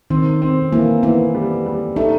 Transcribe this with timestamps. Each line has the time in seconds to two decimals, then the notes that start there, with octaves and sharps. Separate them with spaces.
0.10 D#3 C4
0.42 C4
0.72 E3 A#3
1.03 E3 B3
1.34 G3
1.66 G3
1.96 A3 D#4